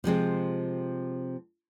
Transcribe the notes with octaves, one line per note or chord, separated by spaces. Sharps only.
C3 F3 G#3 C4